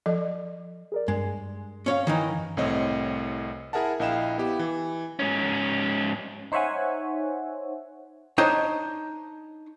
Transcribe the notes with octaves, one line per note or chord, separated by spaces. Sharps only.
F3 A4 D#5
G#4 A#4 D5
G2 G#3
C#4 C#5 F5
D#3 E3 D#4
C2 A2 C4 C#5 D#5
E4 G#4 A#4 E5 F#5 A5
A#1 E4 D#5 F5 G5 E7
B3 E4 G4
E3
G#2 C#4
D#4 C5 C#5 E5 F#5 G#5
D4 D#4 C5 C#5 D#5